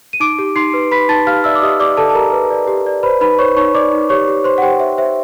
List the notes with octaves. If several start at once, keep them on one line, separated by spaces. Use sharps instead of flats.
D#7
D#4 D6 D7
G4
D#4 C6 C7
B4
B4 B5 B6
D#4 A5 A6
G4 F5 F6
D5 E5 E6
D6
G4 D#5 D#6
G4 D5 D6
A4 D5 A5
A5
G4 A#4 A#5
B4
D5
G4
D5
B4 C5 B5
D#4 B4 B5
C5 C#5 C#6
D#4 C#5 C#6
D#4 D5 D6
D#4
G4 C#5 C#6
G4
C5 C6
F#5
G4 C5 G5
C5 E5
C5 E5